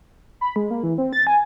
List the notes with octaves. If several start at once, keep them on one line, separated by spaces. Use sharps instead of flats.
B5
G#3
A#3
E3
C4
A6
G#5